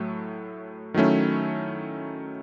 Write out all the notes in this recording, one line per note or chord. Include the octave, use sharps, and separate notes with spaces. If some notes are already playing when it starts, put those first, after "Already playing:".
Already playing: A2 F#3 A3
D#3 F#3 A3 C#4 E4